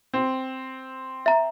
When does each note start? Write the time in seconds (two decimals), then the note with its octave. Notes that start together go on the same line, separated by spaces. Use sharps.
0.14 C4
1.26 E5 A#5